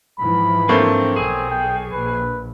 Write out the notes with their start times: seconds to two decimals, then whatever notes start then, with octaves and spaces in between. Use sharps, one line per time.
0.20 G#2 E3 F3 B5
0.69 A3 A#3 C4 D4 C5
1.16 B1 C4 G#4
1.50 G5
1.93 A#1 B4